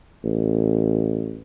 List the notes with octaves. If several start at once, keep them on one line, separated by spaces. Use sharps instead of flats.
A1